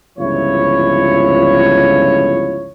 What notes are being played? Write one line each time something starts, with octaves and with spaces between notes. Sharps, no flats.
G1 C#2 F3 E4 C#5